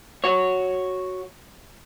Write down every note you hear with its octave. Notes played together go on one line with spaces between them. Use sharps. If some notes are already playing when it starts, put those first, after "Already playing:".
F#4 C#5